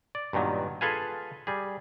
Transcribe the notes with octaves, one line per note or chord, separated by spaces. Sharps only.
D5
G2 A#2 D#3 F#3 B3
F4 G#4 A4 B4 F5 G#5
G3 G#4